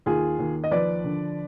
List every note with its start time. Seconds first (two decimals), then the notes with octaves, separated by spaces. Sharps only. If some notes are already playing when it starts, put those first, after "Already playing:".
0.06 D#2 F4 G#4
0.39 D#2
0.64 D#5
0.71 F3 B4 D5
1.04 D3